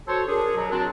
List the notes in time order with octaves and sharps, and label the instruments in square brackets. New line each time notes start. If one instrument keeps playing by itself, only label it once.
[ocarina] F#4 [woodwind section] A4 C5 C#5
[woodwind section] D4 G#4 [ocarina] A#4
[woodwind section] B2 F#3
[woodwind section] C4 D4 [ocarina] F#4